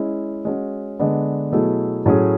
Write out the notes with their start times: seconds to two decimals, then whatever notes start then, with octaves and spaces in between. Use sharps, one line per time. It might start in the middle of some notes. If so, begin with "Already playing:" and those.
Already playing: G#3 C#4 E4
0.45 G#3 C#4 F#4
0.99 D3 G#3 B3 D4
1.52 B2 F#3 A3 E4 G#4
2.06 A2 F#3 A3 C#4 G#4